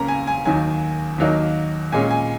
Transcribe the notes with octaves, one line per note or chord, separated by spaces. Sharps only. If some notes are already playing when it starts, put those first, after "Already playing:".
Already playing: C#2 C#3 A#3 C#4 A#5
G#5
G#5
D#2 D#3 F#3 G#5
D#2 D#3 F#3 A#3 D#4
A#2 G#3 C#4 G#5
G#5